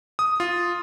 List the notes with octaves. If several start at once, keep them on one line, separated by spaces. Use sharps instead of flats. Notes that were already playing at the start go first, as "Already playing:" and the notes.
D#6
F4